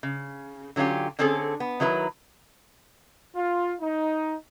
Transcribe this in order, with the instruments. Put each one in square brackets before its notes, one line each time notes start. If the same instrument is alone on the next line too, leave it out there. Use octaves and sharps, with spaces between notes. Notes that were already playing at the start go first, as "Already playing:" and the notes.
[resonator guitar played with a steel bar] C#3
D3 F#3 C#4 F4 G4
D3 C4 C#4 G#4 A4
B3
D#3 F#3 E4 B4 A#5
[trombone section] F4
D#4